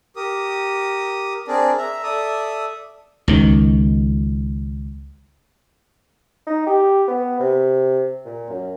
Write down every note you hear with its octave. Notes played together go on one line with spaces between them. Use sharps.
G4 A#4 D#6
C4 D4 G#4 A#4 D5
E5 A#5
A4 D5 E5 D#6
C#2 D#3
D#4
G4
B3
C3
A#2
F#2